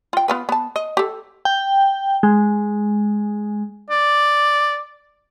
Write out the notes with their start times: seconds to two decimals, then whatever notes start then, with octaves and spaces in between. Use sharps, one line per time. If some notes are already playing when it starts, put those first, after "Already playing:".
0.13 F4 G5
0.28 B3 F4 B4
0.49 B3 A5
0.76 D#5
0.97 G4 A4
1.45 G5
2.23 G#3
3.90 D5